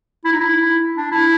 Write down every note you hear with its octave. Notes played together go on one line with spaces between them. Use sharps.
E4
D#4
E4
D4
E4